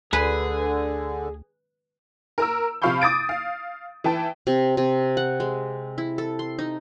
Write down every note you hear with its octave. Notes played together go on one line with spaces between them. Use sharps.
D2 D3 G#4 B4
A#4 A#5 E6
C3 F3 F5 B5 C#6 G6
D6 D#6 A6 D7
F5
E3 E4 G5 A5
C3
C3
F#5
G#3
E4
A4
C6
D#4